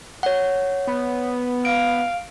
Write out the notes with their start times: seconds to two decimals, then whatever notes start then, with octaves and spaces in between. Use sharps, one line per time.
0.23 C#5 F#5
0.87 B3
1.65 F5 D7